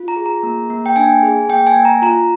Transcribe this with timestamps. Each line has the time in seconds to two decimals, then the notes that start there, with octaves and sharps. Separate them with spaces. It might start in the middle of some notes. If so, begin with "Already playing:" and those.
Already playing: F4
0.08 A#5
0.16 G#4
0.26 A#5
0.43 A#3
0.70 A#3
0.86 G5
0.96 D4 G#5
1.23 G#4
1.49 A#3 G5
1.67 G#5
1.76 A#3
1.85 A#5
2.02 F4 A#5